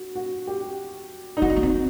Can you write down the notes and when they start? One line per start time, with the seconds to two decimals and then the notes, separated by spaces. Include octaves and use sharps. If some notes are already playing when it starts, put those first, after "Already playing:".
Already playing: F#4
0.15 F#4
0.47 G4
1.37 D#4
1.42 D4 F#4
1.50 C4
1.56 A#3
1.63 C4